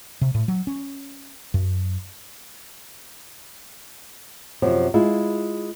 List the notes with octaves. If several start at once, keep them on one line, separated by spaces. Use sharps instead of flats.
C3
A2
F#3
C#4
F#2
F#2 C3 F3
G#3 E4 F4